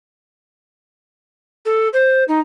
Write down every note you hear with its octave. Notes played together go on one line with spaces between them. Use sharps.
A4
C5
D#4